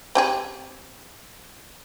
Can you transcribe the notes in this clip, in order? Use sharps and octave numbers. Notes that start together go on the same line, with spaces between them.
C4 G4 G#4